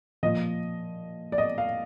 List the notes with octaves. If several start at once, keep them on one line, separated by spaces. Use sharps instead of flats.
A#2 F3 D#5
D5
D#5
F5